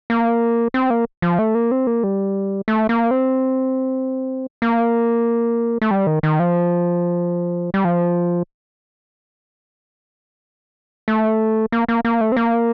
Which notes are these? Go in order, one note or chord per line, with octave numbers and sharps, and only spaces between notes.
A#3
C4
A#3
F3
A3
A#3
C4
A#3
G3
A3
A#3
C4
A#3
A3
G3
D#3
D#3
F3
G3
F3
A3
A#3
A#3
A#3
A3
C4
A#3